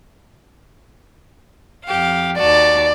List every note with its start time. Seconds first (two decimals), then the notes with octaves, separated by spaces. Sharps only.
1.86 F2 G4 F5
2.38 D#2 F#4 D5 A5